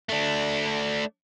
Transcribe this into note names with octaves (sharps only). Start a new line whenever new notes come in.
A3 D4